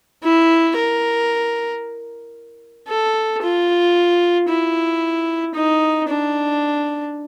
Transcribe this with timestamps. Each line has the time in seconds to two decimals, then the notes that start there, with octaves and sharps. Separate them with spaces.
0.23 E4
0.76 A#4
2.88 A4
3.42 F4
4.49 E4
5.54 D#4
6.08 D4